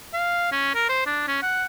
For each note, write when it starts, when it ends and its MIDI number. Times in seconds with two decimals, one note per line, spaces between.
0.14 0.52 77
0.52 0.71 61
0.75 0.89 70
0.89 1.05 72
1.06 1.26 62
1.27 1.39 61
1.42 1.66 78